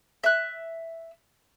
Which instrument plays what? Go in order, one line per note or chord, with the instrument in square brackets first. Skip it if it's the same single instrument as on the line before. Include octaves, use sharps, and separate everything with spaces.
[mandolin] E5 F#6